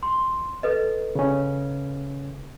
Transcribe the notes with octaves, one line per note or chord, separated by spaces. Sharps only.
C6
A4 B4 D#5
C#3 C#4